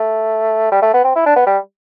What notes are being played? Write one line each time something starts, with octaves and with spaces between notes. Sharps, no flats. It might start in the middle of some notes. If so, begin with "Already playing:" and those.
Already playing: A3
G3
A3
B3
C4
E4
D4
B3
G3